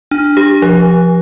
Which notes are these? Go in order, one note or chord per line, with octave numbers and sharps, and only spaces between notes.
D4
G4
F3